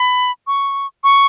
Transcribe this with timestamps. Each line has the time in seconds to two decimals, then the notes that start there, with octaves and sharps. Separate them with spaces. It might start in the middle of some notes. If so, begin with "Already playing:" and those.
Already playing: B5
0.47 C#6
1.04 C#6